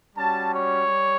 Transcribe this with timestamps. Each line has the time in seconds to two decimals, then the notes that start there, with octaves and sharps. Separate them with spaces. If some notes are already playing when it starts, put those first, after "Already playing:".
0.16 G3 C#4 F#4 A5
0.51 C#5
0.87 G3